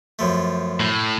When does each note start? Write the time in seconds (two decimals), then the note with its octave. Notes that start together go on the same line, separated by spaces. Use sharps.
0.19 F#2 F3 A3
0.80 A2